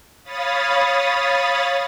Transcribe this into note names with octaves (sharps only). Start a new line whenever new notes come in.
C#5 F5 B5 D#6 A6